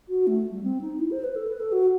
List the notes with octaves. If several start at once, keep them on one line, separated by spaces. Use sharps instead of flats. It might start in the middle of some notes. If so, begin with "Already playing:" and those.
F#4
A3
G3
C4
D#4
E4
C5
B4
A4
B4
A4
F#4